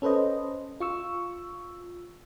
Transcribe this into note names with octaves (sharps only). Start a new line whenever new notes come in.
C#4 A4 B4 C5 D#5
F4 C#6 E6